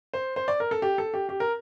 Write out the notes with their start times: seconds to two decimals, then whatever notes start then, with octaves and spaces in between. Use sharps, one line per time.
0.14 C5
0.36 C5
0.48 D5
0.60 A#4
0.71 A4
0.82 G4
0.98 A4
1.14 G4
1.29 G4
1.40 A#4